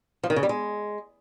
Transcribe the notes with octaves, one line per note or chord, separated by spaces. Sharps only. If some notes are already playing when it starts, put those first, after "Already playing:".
F3
D#3
C#3
G3
G#3